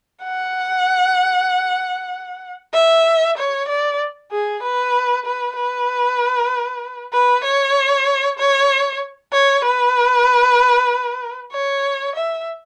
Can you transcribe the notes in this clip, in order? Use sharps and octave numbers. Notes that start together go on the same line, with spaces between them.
F#5
E5
C#5
D5
G#4
B4
B4
B4
B4
C#5
C#5
C#5
B4
C#5
E5